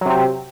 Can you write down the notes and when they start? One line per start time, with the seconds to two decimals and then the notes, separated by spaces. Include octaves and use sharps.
0.01 F#3
0.06 C3
0.10 C4